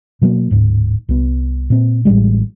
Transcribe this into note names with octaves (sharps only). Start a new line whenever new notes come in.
B2 F#3 G3 A#3
D1 G#2
C2 B3
A#2 C4
A1 E3 G3 G#3